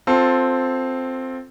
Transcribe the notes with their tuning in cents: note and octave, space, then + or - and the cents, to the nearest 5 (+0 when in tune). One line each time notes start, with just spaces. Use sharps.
C4 +0 F4 +15 A4 +0